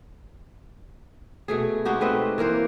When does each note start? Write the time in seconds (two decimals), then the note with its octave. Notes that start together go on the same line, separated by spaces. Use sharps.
1.48 B2 A3 G#4
1.85 G#3 D#4 F#4 G4
2.01 A3 C4 B4 D#5
2.38 E3 A#3 A#4 C5